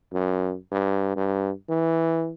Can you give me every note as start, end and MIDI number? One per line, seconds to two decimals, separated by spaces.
0.13 0.55 42
0.72 1.13 43
1.16 1.51 43
1.69 2.32 52